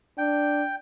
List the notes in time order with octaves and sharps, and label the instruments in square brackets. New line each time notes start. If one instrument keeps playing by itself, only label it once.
[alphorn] D4 [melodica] G5